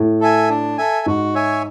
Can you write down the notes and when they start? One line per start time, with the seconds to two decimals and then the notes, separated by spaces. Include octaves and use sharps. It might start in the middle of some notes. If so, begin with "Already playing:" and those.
Already playing: A2
0.21 A4 E5 G#5
0.49 D4
0.78 A4 E5 G#5
1.06 G#2 F#4
1.35 C#5 E5 G#5